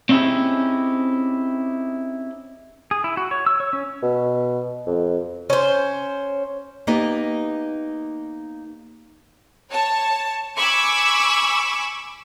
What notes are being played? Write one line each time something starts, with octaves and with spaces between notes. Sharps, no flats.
C4 C#4 D#4 E4 G4 G#4
G#4
E4
F#4
C#5
E6
C#5
C#4
B2
F2
C#4 C5
A#3 B3 D#4 G4 D#5
C#5 A5
G#5 B5 C#6 D6 E6